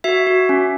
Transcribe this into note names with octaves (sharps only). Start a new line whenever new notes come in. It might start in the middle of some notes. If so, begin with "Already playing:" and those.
F#4 E5
F#4
C#4